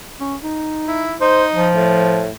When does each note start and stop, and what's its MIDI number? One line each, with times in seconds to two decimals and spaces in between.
0.20 0.36 61
0.42 1.13 63
0.88 1.16 64
1.21 1.70 63
1.21 1.44 72
1.55 2.26 53
1.75 2.32 45